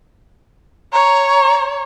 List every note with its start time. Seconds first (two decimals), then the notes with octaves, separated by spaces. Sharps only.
0.93 C#5 A#5